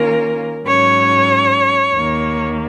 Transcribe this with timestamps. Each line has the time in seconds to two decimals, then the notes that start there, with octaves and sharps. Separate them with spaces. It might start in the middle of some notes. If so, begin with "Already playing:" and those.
Already playing: D#3 A#3 C#4 F4 A#4
0.65 G#2 F#3 C#4 C#5
1.94 D#2 D#3 A#3